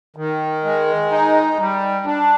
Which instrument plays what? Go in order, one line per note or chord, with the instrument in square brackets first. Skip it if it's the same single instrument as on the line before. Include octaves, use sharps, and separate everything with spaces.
[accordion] D#3
G#3
D#4
G3
D4